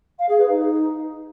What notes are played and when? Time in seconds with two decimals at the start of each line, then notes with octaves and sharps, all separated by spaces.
0.19 F5
0.28 G#4
0.38 B4
0.48 D#4